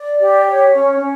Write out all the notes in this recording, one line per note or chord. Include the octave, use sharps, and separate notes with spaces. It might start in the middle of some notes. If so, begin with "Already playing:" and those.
Already playing: D5
G4
C#5
C#4
C#4